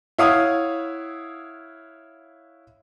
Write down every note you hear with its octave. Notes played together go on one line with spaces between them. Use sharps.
E4 C#5 F5 F#5 D#6